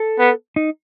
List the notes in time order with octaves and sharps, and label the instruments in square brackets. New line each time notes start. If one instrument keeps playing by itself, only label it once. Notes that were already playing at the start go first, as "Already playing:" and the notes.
Already playing: [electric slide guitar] A4
[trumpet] B3
[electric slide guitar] D#4